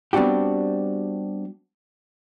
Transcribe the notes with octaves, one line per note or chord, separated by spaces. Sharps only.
G3 B3 C4 D4 F#4 G4